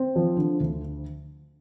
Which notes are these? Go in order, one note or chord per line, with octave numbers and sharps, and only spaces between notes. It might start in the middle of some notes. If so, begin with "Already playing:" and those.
Already playing: C4
F3
D3
D2